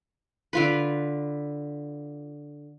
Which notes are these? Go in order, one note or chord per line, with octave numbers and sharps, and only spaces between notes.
D3 F4 B4